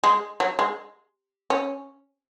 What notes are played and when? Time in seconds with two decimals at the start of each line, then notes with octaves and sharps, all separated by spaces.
0.04 G#3
0.40 F#3
0.59 G#3
1.50 C#4